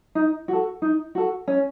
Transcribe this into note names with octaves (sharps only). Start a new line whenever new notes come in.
D#4
F#4 A4
D#4
F#4 A4
C#4